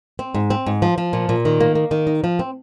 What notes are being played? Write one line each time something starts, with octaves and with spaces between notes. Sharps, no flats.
C4
G#2
C4
G#2
F3
F3
A#2
A#2
D#3
A#3
A#3
D#3
D#4
F3
C4